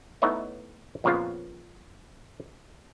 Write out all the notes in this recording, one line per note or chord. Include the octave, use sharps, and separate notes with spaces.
A3 B3 D#4 E4 C#5 D#5
F2 A#2 C#3 F3 B3 F4